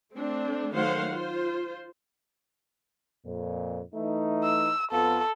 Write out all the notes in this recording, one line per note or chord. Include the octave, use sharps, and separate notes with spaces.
A3 C4 D4
D#3 F#3 A3 C5 F5 F#5
F4 C5
F2 A#2
E3 A3 D#4
E6
F2 B3 F4 A4